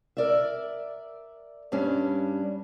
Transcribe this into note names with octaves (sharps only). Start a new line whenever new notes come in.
A#4 D5 E5
G2 G3 C#4 D4